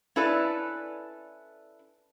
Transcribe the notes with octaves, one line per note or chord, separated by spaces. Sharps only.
C#4 E4 A4 B4 D5